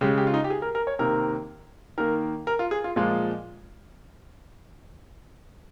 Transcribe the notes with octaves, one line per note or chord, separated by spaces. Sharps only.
C#3 G#3 G4
G4
F4
D#4
G4
G#4
A#4
A#4
C#5
C3 D#3 A#3 A#4
D#3 A#3 A#4
A#4
F4
G#4
F4
A#2 F3 G#3 F4